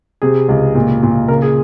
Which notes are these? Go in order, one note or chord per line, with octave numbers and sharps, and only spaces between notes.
C3 G#4
C#2
A#2
A#2
C#3 A#4
G#4